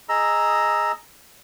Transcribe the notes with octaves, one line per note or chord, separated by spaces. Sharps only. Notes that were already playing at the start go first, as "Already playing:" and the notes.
G#4 D#5 A#5 E6